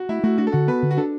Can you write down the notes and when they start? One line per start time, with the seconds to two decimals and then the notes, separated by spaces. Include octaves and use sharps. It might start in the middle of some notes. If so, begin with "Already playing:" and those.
Already playing: F#4
0.09 A3 E4
0.23 A3 F#4
0.38 D4 F#4
0.47 A4
0.52 D3 F#4
0.68 B3 B4
0.82 D3
0.91 F#4
0.97 D4 A4